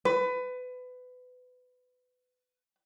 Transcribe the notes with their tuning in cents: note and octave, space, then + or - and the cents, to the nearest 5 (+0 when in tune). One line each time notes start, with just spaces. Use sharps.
B4 +25